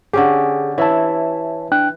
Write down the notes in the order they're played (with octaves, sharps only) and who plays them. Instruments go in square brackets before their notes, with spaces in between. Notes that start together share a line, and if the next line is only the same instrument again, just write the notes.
[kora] D3 C#4 G4 [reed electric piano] G#4
[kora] E3 E4 [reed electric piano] C#5 E5 A5
[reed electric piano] D4 G5 F#6